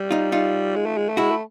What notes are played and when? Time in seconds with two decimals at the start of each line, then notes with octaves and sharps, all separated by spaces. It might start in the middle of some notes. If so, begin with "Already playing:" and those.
Already playing: G3
0.11 D#4 F4
0.32 D#4 F4
0.75 G#3
0.86 A3
0.97 G#3
1.09 A3
1.17 G#3 E4 F#4
1.31 A3